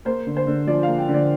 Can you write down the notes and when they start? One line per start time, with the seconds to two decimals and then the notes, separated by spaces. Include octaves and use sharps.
0.05 A#3 C5
0.27 D3
0.37 C5
0.47 D3
0.67 F3 D5
0.83 A#3 F5
0.98 G5
1.09 D3
1.14 D5